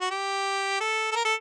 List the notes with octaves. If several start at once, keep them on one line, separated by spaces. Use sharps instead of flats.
F#4
G4
A4
A4
A#4
A4